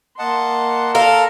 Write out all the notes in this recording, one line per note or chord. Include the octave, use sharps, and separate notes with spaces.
A#3 D#5 F#5 A5 C6
A4 A#4 F5